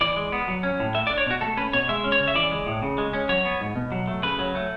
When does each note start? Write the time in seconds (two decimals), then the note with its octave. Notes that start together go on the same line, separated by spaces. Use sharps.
0.01 E3 D5
0.16 G#3
0.32 B3
0.48 F#3
0.63 C#4
0.79 A2
0.95 A3 E5
1.07 D5
1.11 D4
1.18 C#5
1.26 B2 F#4
1.41 A3 A4
1.57 C#4 B4
1.73 B2 C#5
1.89 G#3 E5
2.04 C#4
2.12 C#5
2.20 C#3
2.28 E5
2.35 E3 D5
2.51 G#3
2.66 A2
2.82 C#3
2.98 G#3
3.13 C#4
3.29 F#3 C#5
3.45 B3
3.61 G#2
3.76 B2
3.92 F#3
4.07 A3
4.23 C#3 B4
4.39 F#3
4.55 A3